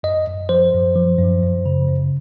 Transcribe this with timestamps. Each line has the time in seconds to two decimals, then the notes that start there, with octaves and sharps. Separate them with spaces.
0.03 F#2 D#5
0.27 F#2
0.49 F3 C5
0.73 F#2
0.96 F3
1.19 F#2
1.43 F#2
1.66 C#3
1.89 F#2